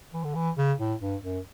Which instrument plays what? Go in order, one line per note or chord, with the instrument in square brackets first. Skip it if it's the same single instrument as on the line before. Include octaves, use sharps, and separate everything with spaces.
[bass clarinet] E3
D3
E3
C#3
A2
G2
F#2